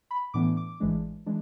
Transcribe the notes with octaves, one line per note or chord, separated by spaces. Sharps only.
B5
A2 E3 B3 D4 D6
D6
A1 G#2 E3 G#3 D4
E3 G#3 D4